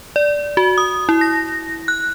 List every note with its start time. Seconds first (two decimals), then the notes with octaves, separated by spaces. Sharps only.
0.16 D5
0.57 F#4
0.78 D#6
1.09 E4
1.21 A#6
1.88 F#6